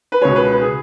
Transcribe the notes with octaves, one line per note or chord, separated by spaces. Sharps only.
B4
C#2 B2 G#3 C#5
B4
B4
G#4